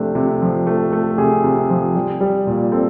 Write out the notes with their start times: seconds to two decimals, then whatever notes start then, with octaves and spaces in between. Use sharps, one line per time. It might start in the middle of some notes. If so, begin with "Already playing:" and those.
Already playing: C3 F3 A3 D4
0.15 C3
0.42 F3
0.67 A3
0.93 A3
1.18 C3 G#4
1.44 C3
1.70 F3
1.95 G3
2.21 G3
2.47 A#2
2.72 C4 A4